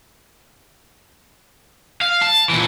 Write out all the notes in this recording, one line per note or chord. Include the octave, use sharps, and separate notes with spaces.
F5
A5
A#2 E3